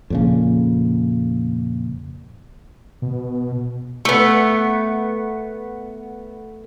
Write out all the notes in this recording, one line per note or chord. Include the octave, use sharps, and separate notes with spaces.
F2 A#2 C#3
B2
A3 B3